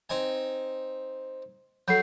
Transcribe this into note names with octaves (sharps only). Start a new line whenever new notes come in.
C4 D#4 G#5
F#3 A4 F#5 B5 G6 C7